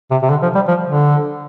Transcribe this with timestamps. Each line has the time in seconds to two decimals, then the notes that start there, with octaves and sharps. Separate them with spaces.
0.11 C3
0.22 C3
0.30 D3
0.42 F3
0.55 G3
0.68 F3
0.87 D3